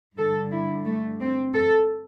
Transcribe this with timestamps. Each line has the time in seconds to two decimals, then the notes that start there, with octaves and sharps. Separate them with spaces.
0.18 G2 D3 A4
0.52 E4
0.86 A3
1.21 C4
1.55 A4